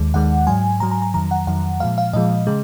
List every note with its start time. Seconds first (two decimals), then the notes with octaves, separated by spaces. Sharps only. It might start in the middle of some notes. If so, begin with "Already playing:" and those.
Already playing: D#2 D#3 G#3
0.14 D#2 D#3 G#3 F#5
0.47 G#2 F#3 G#5
0.80 G#2 F#3 A#5
0.91 A#5
1.02 A#5
1.14 F2 D#3 F#3 A#5
1.31 F#5
1.47 F2 D#3 F#3 F#5
1.80 A#2 F3 G#3 F5
1.98 F5
2.13 A#2 F3 G#3 D#5
2.47 C#3 G#3